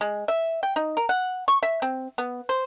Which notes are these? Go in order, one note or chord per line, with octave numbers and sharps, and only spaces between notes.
G#3
E5
G5
D#4
A#4
F#5
C#6
E5
C4
B3
C5